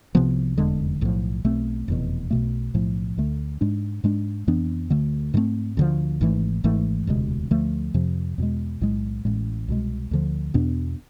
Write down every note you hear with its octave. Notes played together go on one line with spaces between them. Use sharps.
C2 C3 F3 B3
F1 E2 D3 G#3
B1 A2 F3
B1 B2 A3 C4
F1 E2 B2
B1 B2 A3
B1 A2 F3 A3
D2 D3 A3
G#2 G#3 D4
G#2 G#3 D4
F2 E3 B3 D4
D2 D3 A3
G#2 E3 A3 C4
D2 D3 F3
G#1 G#2 E3 A3
G#1 G#2 E3 A3
E1 D2 C3 G#3
D2 D3 F3 A3
F2 C3 F3
E2 B2 G#3
B1 A2 G#3
A1 A2 G#3
C2 B2 G#3
D2 D3 F3
E2 B2 B3 D4